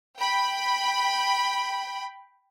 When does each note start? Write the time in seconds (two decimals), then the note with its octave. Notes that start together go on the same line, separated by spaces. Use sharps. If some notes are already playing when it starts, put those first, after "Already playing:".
0.19 G5 B5